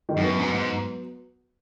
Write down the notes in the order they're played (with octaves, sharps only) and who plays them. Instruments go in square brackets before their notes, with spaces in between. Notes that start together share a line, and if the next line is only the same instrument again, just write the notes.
[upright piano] D#3 G#3
[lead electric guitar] F#2
[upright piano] F#3 B3
[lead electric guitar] G#2
G#2